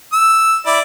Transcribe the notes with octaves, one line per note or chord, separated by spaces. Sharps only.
E6
E4 D5